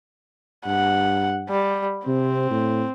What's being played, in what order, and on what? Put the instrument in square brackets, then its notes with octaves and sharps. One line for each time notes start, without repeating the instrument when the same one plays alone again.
[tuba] G2 [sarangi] F#5
[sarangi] G3
[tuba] C3 [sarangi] C4
[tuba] A2